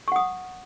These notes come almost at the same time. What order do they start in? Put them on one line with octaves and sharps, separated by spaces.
C#6 F#5 D#6